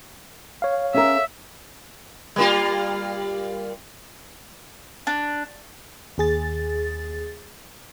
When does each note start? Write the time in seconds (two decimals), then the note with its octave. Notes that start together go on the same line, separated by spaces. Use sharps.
0.62 C#5 F5
0.94 C#4 G#4 A#4 E5
2.36 G3 A#3 F4
5.07 D4
6.18 D#2 G#4 A6